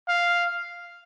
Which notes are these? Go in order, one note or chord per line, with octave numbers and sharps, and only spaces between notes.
F5